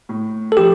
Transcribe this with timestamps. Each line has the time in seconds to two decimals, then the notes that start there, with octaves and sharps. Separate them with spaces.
0.09 A2
0.52 A4
0.57 F3 G4